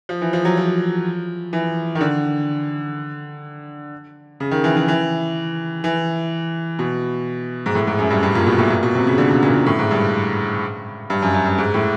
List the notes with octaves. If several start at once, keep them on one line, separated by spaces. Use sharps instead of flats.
F3
E3
F3
F#3
F3
E3
D#3
D3
C#3
D#3
E3
E3
E3
E3
B2
G#2
A2
G#2
F#2
G2
G2
A#2
B2
A2
A#2
B2
C3
C#3
D3
B2
A#2
A#2
A2
G#2
G2
G2
F#2
F#2
G2
G#2
A2